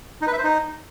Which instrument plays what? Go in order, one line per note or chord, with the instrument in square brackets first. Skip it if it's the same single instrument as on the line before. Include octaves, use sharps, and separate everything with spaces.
[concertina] D#4
B4
E5
C5
D#4